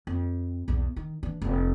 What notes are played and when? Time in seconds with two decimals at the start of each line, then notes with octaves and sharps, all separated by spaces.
0.07 F2
0.68 B1 E2
0.96 D#3
1.23 E3 D4
1.42 F1